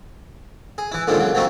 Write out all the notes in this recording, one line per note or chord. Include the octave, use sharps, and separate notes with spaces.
G#4
E3 E4
A#2 D3 D#3 F3 G#3
C#3 F#3
F3 F#3 A3 C4 D#4